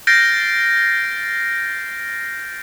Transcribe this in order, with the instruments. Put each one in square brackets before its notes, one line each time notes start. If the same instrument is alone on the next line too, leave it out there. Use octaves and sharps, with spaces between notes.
[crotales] F6 G6 A6 A#6 C7 D7